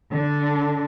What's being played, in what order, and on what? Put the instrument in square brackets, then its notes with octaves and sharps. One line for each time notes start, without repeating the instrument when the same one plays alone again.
[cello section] D3 D4